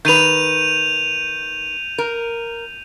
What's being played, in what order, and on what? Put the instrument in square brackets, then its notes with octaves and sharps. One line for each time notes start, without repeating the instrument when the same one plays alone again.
[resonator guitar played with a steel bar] D#3 B4 [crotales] G6 D#7 F7
[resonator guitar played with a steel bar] A#4